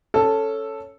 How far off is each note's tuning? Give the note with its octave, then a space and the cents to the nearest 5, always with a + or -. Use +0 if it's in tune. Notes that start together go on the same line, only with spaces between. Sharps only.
C#4 +0 A4 +0